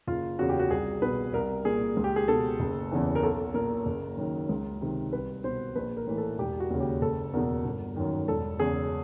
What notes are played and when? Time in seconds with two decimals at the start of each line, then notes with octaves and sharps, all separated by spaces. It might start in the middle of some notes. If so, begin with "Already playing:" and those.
0.07 F#1 F4
0.39 E2 C#3 F#4
0.49 G4
0.59 F#4
0.70 C2 G#4
1.02 B2 B4
1.33 C2 A#4
1.65 A#2 G#4
1.97 C#2
2.04 G4
2.16 G#4
2.28 B2 A4
2.60 F#1
2.91 E2 C#3 E3
3.15 A#4
3.23 B1 A4
3.54 A#2 A#4
3.86 F#1
4.17 F#2 D#3
4.49 C#2
4.81 C3 D#3
5.12 C2 B4
5.44 B2 C5
5.76 A#1 B4
5.97 A#4
6.07 A2 E3
6.18 A4
6.38 E1 G4
6.60 F#4
6.70 D#2 C#3
6.80 G4
7.02 F#1 A4
7.34 E2 B2 A#4
7.65 G1
7.96 F#2 D#3
8.28 E1 A4
8.59 E2 C#3 G#4